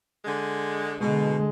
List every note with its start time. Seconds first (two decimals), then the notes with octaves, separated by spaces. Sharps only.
0.25 D3 G#3
1.00 B2 D3 G#3